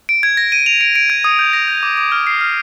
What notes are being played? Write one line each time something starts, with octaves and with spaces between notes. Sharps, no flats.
D7
G#6
A#6
D#7
F7
D7
D7
G#6
D#6
G6
A#6
G6
D6
D6
F6
C7
F6